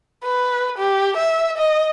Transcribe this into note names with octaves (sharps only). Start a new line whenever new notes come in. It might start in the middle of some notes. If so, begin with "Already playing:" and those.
B4
G4
E5
D#5